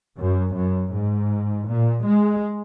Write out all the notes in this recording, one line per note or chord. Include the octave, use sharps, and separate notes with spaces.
F#2
F#2
G#2
A#2
G#3